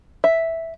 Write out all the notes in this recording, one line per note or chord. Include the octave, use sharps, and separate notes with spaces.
E5